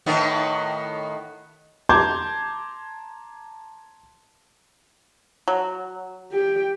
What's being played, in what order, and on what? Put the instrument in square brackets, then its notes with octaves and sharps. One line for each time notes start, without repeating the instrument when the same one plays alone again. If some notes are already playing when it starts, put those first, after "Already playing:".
[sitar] A2 D#3 B3
[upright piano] A5 A#5 C6 D6 G6 G#6
[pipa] F#3
[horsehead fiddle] G4 G5